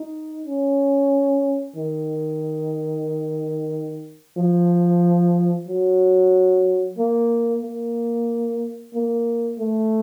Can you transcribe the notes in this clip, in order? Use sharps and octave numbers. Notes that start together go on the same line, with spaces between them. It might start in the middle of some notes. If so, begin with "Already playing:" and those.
Already playing: D#4
C#4
D#3
F3
F#3
A#3
A#3
A#3
A3